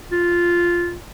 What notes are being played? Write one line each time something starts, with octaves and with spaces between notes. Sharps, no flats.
F4